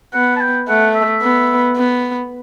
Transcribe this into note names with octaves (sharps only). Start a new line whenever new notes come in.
B3 F#5
A5
G5
A3 F#5
E5
B3
B3